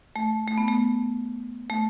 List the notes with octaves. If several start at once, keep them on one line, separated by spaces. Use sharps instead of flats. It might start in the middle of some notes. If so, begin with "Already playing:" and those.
A3
A3
B3
A3
A3